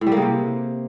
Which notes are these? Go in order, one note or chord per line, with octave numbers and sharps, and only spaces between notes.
A2
G3
A#3
C#3
C3